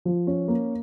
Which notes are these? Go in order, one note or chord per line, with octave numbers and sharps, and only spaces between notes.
F3
C#4
A#3